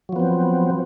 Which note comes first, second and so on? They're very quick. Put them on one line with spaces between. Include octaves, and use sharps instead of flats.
F#3 F3 B3 C4